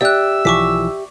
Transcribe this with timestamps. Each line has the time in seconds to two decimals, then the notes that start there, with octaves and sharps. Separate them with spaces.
0.01 G4 D5 E5 E6 F#6
0.45 B1 E3 F3 C#6 D6 B6